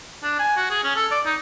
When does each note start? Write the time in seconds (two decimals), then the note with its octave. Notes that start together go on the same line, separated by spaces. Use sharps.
0.23 D4
0.39 G#5
0.57 F#4
0.71 G#4
0.84 C#4
0.96 A4
1.11 D5
1.26 D#4